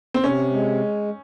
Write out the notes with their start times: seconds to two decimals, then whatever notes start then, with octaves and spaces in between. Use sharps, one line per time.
0.14 C4
0.24 C3 C#4
0.53 G#3